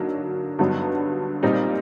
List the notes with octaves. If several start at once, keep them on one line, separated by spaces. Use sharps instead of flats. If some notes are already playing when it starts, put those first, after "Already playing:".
Already playing: D3 F#3 A#3 D#4
G2 D3 F#3 B3 D#4
A#2 G3 C4 D#4